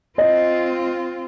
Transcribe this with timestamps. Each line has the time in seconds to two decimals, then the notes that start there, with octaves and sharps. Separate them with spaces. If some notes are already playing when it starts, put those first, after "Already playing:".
0.18 C4 F4 D#5